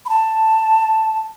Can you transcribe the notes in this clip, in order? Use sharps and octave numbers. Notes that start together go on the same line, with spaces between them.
B5
A5